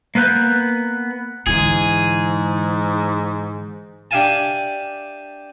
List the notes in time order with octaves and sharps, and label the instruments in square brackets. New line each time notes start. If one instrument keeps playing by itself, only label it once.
[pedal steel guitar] A#3 B3 B4 F#6 G6
[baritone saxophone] G#2 [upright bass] D3 E3 [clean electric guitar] G#4
[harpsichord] D4 G4 E5 F5 G#5 A5